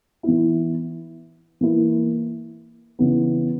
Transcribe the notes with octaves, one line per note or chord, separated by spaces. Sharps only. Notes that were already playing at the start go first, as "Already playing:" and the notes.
E3 B3 E4
E3 A#3 E4
C#3 E3 B3